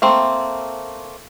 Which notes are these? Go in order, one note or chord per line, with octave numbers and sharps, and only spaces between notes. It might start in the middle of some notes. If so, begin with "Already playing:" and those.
A3 A#3 C4